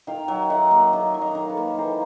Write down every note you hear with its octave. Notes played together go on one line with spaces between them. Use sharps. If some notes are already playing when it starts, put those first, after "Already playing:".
D#3 F5 G5
F#3
D#3 E5 F#5
A#3
D#3
F#3
D#5 F5
D#3
A4 B4
A#3
E3 A#4 C5